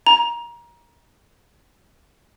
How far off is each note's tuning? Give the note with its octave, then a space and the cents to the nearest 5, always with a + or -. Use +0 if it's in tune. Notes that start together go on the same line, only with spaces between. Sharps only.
A#5 +25